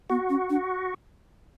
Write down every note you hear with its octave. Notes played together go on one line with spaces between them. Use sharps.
B3 F#4
C#4
D4